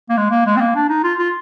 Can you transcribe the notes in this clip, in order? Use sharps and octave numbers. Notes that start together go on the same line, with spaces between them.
A#3
G#3
A#3
G#3
C4
A#3
D4
D#4
F4
F4